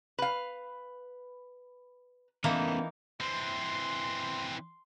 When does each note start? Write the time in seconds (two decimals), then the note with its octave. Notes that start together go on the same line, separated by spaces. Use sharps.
0.19 B4 F5
2.44 E3 A#3 B3 C#4 D#4 A4
3.21 E3 C4 C6